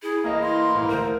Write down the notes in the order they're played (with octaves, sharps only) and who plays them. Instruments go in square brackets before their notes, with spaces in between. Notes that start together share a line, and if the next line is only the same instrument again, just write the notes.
[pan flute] E4 [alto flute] G#4
[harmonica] E3 F5 A#5 [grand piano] A#3 D#5
[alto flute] C6
[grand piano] G#2
[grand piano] D2 A#4 [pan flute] C5